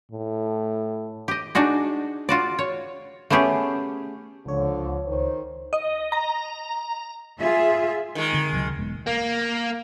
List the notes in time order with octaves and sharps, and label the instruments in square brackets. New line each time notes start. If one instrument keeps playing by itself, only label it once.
[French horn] A2
[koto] G4 D#5
D4 D#4 F#4 G#4
F4 F#4 D5
C#5
A3 B3 C#4 G4 G#4
[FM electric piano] C#2 C#5 [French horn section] D3 F3
[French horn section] D#3 C5
[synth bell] D#5
A#5
[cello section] F4 G#4 E5
[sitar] D#3 G#3
[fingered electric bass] D3 C4
C#2 C3 F#3
E1 G#3 B3
[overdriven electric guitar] A#3